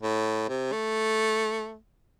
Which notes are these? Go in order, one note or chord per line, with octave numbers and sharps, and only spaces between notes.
A2
C3
A3